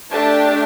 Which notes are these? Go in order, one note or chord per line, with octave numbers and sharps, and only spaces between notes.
A3 D4 G4 A5